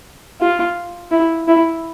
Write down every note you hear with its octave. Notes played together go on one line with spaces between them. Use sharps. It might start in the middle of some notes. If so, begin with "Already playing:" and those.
F4
E4
E4